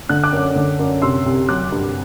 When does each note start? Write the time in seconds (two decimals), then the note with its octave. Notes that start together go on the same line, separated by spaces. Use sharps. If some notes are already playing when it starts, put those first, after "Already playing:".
0.09 D3 F#6
0.23 D6 F#6
0.33 F#2
0.55 D3
0.79 F#2
1.02 C3 C6 E6
1.26 C2
1.49 F#3 D6 F#6
1.72 G2